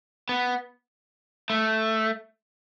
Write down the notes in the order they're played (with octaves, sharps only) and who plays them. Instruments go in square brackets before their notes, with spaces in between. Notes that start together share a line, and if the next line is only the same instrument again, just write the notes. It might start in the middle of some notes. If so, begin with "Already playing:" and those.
[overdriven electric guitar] B3
A3